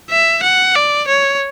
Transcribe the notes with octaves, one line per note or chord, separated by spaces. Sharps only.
E5
F#5
D5
C#5